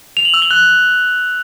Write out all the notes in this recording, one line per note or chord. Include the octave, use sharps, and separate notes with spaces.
F7
F#7
E6
G7
F#6